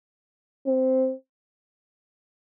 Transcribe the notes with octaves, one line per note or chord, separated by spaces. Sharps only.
C4